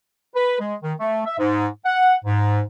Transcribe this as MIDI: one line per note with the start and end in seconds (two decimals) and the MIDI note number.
0.35 0.60 71
0.60 0.75 56
0.83 0.93 51
1.00 1.22 57
1.26 1.38 76
1.39 1.67 44
1.86 2.15 78
2.25 2.61 44